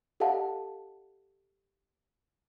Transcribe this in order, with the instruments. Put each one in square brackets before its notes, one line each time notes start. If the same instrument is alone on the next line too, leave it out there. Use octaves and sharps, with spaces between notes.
[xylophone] G4 A4 D#5 F5 F#5 A5